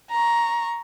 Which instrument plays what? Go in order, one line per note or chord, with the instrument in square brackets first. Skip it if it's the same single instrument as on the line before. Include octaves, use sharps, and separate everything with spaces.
[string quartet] A#5 C#6